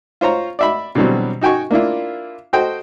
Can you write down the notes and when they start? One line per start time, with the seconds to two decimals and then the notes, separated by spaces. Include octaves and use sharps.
0.21 F4 C5 C#5 A#5
0.59 D5 E5 B5
0.95 B2 D3 E3 F#3 G3 C4
1.41 D#4 F#4 G5 G#5 C#6
1.71 A#3 D4 E4 F4
2.53 F#4 A4 C5 D#5 G5